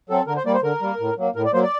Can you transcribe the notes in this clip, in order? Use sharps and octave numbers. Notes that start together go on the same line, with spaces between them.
F#3 C4 A4
D3 A#4
C5
G3 A#3 D5
C5
D3 A#4
G3 A#3
A2
F#3 A#3
A2 A#4
D5
F#3 A#3 C5
D5